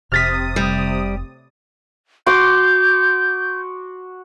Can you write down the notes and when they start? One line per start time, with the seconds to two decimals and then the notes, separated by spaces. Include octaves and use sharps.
0.12 F1 C3 D#6 F6 A6 B6
0.56 G3
2.26 F#4 C6 D6 G6